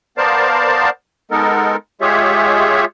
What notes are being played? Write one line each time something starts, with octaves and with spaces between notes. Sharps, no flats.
B3 A#4 C5 D5 F5 A5
G#3 B3 D#4 A4 A#4
G#3 F4 G4 G#4 C#5 E5